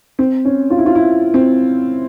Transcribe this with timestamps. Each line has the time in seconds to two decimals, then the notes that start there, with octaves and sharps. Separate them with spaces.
0.19 C4
0.45 C#4
0.70 F4
0.78 E4
0.86 F4
0.95 E4
1.34 C4